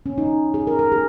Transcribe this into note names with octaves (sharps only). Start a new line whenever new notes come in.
C#4
D#4
G#4
A#4
A#4
G#4